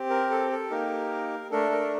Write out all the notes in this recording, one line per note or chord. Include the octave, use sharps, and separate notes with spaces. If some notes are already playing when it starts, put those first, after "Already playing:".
Already playing: C4 G4
A#4
A4
A4
A#3 D#4 G4 A#4
A3 D4 A4 A#4
A#4